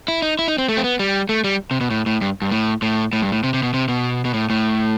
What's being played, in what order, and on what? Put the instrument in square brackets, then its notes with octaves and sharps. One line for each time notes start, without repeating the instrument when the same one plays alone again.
[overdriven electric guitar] E4
D#4
E4
D#4
C4
A3
C4
B3
G3
A3
G3
C3
B2
A2
A2
G2
G2
A2
A2
A2
G2
A2
C3
C3
B2
C3
B2
B2
A2
A2